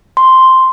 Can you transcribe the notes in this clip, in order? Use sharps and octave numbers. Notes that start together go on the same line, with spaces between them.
C6